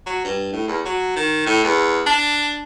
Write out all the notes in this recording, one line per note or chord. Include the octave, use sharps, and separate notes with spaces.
F#3
G2
A2
E2
F#3
D#3
A2
E2
D4